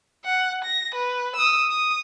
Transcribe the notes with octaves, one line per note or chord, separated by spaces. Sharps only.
F#5
A#6
B4
D#6 E6
D#6